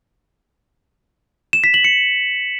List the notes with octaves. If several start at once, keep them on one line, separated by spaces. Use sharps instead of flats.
E7
B6
F#7
C#7